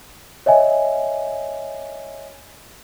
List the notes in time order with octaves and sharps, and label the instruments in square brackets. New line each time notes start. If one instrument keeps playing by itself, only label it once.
[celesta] C#5 D#5 E5 G#5